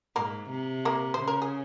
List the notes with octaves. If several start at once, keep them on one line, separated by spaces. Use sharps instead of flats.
G#2 A#3 A#4
C3
A#3 A#4
C5
C#3
A#4
G#4